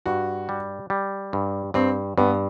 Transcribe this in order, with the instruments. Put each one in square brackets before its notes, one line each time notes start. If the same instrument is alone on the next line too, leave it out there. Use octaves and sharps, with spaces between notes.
[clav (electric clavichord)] G2 [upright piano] F#4
[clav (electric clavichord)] G3
G3
G2
[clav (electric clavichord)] G2 [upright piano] C4
[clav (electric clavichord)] G2 [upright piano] B3